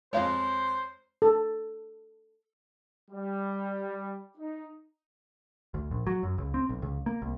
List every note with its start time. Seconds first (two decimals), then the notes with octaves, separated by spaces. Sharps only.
0.13 F2 G#3 C5 C#5 F5
1.22 A4
3.11 G3
4.38 D#4
5.74 D2
5.91 A#1
6.07 F#3
6.23 F#2
6.38 C#2
6.54 C4
6.69 B1
6.82 C#2
7.06 A#3
7.22 C2